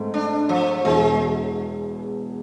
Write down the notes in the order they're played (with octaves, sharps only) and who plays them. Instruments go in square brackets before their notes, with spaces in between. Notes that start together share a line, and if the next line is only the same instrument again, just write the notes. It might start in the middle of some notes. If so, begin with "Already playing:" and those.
Already playing: [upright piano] G#2 A3 C4
[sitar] D4
F3
[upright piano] E1 E2 B2 [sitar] G#3